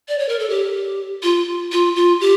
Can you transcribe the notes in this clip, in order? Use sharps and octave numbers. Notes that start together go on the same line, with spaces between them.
D5
C#5
A#4
A4
G4
F4
F4
F4
G4